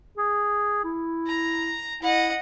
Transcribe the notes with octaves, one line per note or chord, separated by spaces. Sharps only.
G#4
E4
A#5
E4 D#5 F#5